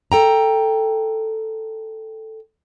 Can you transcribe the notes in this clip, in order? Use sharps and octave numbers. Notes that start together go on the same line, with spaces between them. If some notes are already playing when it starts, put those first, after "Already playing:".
A4 G5 A#5